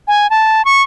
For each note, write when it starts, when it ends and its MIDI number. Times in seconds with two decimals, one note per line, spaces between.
0.08 0.30 80
0.30 0.65 81
0.65 0.82 85